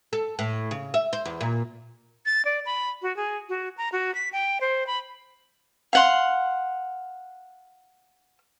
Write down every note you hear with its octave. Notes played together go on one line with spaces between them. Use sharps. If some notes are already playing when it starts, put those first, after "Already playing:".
A4
A2
C#3
E5
C5
E2
A#2
A6
D5
B5
F#4
G#4
F#4
A#5
F#4
B6
G5
C5
B5
F5 F#5 C6